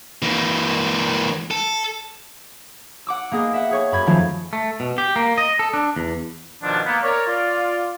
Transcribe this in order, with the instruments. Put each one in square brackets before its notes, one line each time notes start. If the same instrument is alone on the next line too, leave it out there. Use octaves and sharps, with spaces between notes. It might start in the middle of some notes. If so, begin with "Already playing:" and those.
[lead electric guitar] E3 A#3
A4
[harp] F#5 D6 E6
A#3 B3 G#4 D#5
E5 F#5
G#4 C#5 C#6
F#2 B5 G#6
D#3 F3 F#3 A3 C#4 F4
[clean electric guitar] A3
B2
G4
A#3
D#5
A4
D4
E2
[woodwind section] B2 D#3 F3 D4
A#3 B3
A#4 C#5 D5
F4 D5